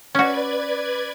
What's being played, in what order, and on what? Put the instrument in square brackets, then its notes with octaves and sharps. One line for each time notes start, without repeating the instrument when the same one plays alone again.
[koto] C#4 F#4 [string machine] B4 D5 G#6